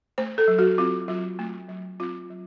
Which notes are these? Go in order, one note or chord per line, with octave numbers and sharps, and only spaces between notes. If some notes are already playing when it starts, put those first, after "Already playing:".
A3 C5
A4
F#3
F#4
C4 F4
F#3 F4
A3
F#3
C4 F4
F#3